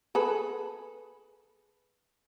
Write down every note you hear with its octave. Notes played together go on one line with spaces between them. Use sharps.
G#4 A4 B4